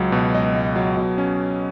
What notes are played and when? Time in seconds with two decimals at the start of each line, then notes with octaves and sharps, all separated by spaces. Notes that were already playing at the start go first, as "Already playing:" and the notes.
Already playing: C#2 F#3
0.12 B2
0.34 C#2 D#5
0.55 C#2
0.76 F#3
0.97 B2
1.18 C#4